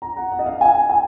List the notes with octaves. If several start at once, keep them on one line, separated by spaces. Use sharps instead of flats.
A#5
F#5
F#5
D#5
F5
G#5
G#5